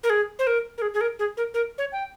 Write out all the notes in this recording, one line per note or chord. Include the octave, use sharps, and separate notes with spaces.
A#4
G#4
C5
A#4
A#4
G#4
G#4
A#4
G#4
A#4
A#4
C#5
G5